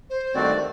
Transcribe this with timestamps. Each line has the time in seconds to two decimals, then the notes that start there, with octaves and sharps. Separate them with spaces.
0.10 C5
0.35 G2 D#3 A3 C4 F#4 D5